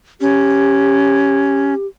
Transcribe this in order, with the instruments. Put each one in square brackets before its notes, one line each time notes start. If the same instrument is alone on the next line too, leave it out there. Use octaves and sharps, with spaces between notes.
[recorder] C#4 [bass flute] G4